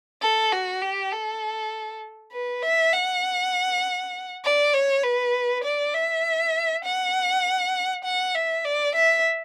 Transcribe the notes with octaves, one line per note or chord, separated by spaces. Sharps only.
A4
F#4
G4
A4
B4
E5
F#5
D5
C#5
B4
D5
E5
F#5
F#5
E5
D5
E5